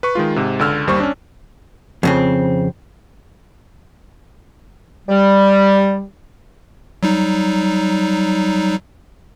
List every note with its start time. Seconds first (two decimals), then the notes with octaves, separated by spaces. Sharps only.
0.03 B4 C#6
0.15 D#3 G#3 F4
0.36 G#2 C3
0.59 C#2 D3 E6 F6
0.87 G1 D#2 G3 C5 C#6
1.00 C#4 D4
2.03 F2 C#3 C4
5.09 G3
7.03 F#3 G3 D#4